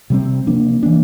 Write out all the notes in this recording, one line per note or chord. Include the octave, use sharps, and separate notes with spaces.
C3 G3 C4
C3 F3 A#3 D4
E3 A#3 D4